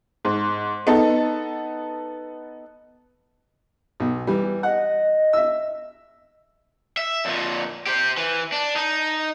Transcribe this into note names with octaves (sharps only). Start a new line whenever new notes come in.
G#2
B3 D#4 A4
B1
E3 G3
D#5 F#5
E5 E6
E5
F2 A#2
G4 C5
E3
D4
D#4